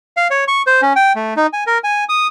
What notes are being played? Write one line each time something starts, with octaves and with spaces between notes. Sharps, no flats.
F5
C#5
C#6
C5
C#4
G5
A3
D#4
G#5
A#4
G#5
D#6